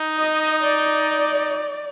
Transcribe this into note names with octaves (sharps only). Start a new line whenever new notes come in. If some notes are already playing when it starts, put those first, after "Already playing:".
Already playing: D#4
D#5
D5